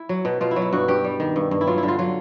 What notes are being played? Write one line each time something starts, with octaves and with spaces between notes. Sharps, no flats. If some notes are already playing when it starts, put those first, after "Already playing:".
Already playing: E4
F#3
B2
B2 F4
E4
F#3
E4
G2 F#4
G2 G4
G3
D#3
G2
G2
E4
F#3 F4
E4
D3
F4
F#3 F4